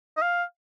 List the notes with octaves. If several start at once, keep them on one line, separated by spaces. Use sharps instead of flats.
D#5
F5